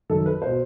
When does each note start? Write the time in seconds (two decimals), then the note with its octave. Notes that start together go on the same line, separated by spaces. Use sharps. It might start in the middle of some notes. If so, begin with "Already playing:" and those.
0.10 F#2 D#3 A4
0.26 B4
0.42 B2 C5